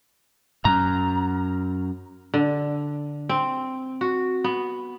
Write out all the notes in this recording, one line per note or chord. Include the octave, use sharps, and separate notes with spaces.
F#2 A#5
D3
C4
F#4
B3